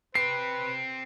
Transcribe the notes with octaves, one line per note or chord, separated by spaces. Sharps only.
C4 G4 B4 C7